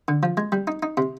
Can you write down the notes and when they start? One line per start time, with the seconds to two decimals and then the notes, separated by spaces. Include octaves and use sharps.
0.08 D3
0.23 F3
0.37 G#3
0.52 G3
0.67 D#4
0.83 D#4
0.97 C3